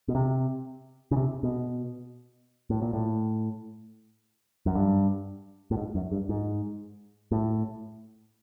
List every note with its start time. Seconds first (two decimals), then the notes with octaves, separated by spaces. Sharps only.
0.08 B2
0.15 C3
1.11 C#3
1.16 C3
1.43 B2
2.70 A2
2.82 A#2
2.93 A2
4.66 F#2
4.75 G2
5.71 A2
5.77 G#2
5.95 F#2
6.12 G2
6.29 G#2
7.31 A2